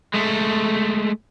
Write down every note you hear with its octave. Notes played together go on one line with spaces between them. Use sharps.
G#3 A3